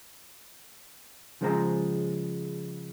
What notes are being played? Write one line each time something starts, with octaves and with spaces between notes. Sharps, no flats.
C#3 F3 G#3 C5 D#5 A#5